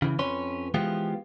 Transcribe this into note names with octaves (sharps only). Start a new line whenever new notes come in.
C#3 E3
F2 C#4 B4 C#5 C6
E3 F3 G#3 B3 F4 G4